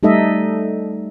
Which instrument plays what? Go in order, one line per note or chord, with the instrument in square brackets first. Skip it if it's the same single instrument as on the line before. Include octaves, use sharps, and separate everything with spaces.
[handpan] G3 A3 D#4 A4 D#5 E5